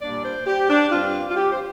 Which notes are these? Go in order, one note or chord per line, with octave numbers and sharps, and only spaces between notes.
A#2 G3 A#3 D4 D5
C5
G4
D4
G2 G3 C4 F4
F4
G4
C5